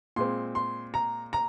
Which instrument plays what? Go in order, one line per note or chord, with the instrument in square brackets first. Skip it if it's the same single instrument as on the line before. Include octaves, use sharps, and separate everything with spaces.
[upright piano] A#2 G#3 C4 C6
C6
A#5
A#5